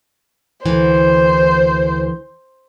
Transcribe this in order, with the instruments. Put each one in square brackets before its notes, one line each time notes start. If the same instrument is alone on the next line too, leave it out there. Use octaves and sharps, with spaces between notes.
[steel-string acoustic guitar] D2 E3 [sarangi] C5